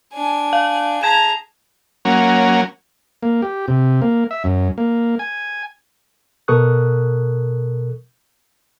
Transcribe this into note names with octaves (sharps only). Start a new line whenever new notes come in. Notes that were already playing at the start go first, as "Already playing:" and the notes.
D4 G#5
F5
G#4 A5 A#5 G#6 E7
F#3 A#3 C#4
A#3
G4
C3
A#3
E5
F#2
A#3
G#5
B2 A4 A#4 C#6 D#6 F#6